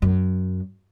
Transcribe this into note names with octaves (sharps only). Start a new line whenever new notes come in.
F#2